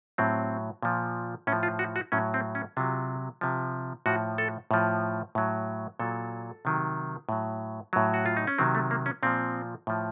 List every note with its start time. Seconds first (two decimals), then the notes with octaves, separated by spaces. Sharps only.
0.18 A2 F#3 C4
0.82 A#2 F3
1.47 A2 C#4
1.52 F3
1.63 F4
1.79 F#4
1.96 F#4
2.12 A2 F#3 C#4
2.34 C4
2.55 C#4
2.77 C3 F#3 F4
3.41 C3 F3
4.06 A2 F3 F#4
4.38 A4
4.71 A2 F3
5.35 A2 F#3
5.99 A#2 F#3 A4
6.65 C3 D#3 F#3
7.29 A2 F#3
7.93 A2 F#3
8.14 F#4
8.26 F4
8.37 D#4
8.47 C#4
8.58 C3 D#3 F#3 C4
8.75 A3
8.91 A#3
9.06 C#4
9.23 A#2 F3 C4
9.87 A2 F3